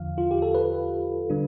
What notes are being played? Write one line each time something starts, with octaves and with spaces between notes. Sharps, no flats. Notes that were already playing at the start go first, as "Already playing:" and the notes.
Already playing: E2 D3 F3 F5
F4
G4
A4
B4
D3 G3 D4